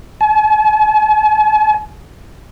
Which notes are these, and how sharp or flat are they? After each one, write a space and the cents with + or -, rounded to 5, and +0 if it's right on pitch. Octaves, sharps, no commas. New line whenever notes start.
G#5 +45